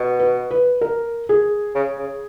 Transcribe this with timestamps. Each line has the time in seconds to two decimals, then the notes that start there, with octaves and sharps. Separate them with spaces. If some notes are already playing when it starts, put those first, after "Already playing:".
Already playing: B2
0.19 B4
0.51 B4
0.81 A#4
1.29 G#4
1.75 C#3
1.99 C#3